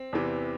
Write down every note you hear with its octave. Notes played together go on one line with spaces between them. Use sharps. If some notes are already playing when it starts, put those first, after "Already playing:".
Already playing: C4
E2 C3 E3